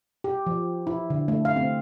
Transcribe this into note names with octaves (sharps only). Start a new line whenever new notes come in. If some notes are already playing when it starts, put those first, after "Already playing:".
G4
F3
E4
D3
A3
F5
C4